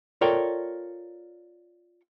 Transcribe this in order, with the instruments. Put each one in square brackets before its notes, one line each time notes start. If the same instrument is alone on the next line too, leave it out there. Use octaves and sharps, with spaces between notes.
[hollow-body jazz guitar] F4 A4 A#4 C#5 D5 G5